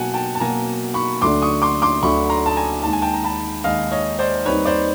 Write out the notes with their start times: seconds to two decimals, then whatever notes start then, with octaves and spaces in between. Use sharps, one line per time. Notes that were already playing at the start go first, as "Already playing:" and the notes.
Already playing: B2 F#3 A#3 F#5 G#5 A5
0.14 G5 A5
0.35 A5
0.40 B2 F#3 A#3 G#5 A#5
0.94 B5 C#6
1.22 D2 D3 F#3 A3 D4 C6 D6
1.42 C#6 D#6
1.62 C6 D6
1.82 C6 D6
2.03 D2 D3 F#3 A3 D4 B5 C#6
2.30 A#5 C6
2.46 A5
2.56 G#5 A#5
2.83 D#2 D#3 G#3 A5
2.93 G#5
3.02 G5 A5
3.13 A#5
3.24 A5 B5
3.64 D#2 D#3 G#3 D#5 F5
3.91 C#5 D#5
4.19 C5 D5
4.45 D#2 D#3 G3 C4 D#4 B4 C#5
4.65 C5 D5